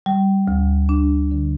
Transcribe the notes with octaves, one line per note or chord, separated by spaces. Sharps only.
G3
D2
D4
D3